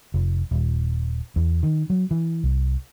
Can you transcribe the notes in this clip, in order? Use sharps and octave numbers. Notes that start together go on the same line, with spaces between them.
F1
D#1
E2
D#3
F#3
E3
C2